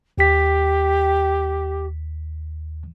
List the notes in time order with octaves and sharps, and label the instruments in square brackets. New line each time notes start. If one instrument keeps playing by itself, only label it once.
[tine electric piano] D#2 B6 [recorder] G4